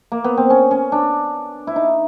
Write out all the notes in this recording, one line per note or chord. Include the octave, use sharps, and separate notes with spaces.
A#3
B3
C4
C#4
C#4
D4
E4
D#4